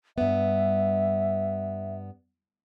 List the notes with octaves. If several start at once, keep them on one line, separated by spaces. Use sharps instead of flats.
G2 B3 E5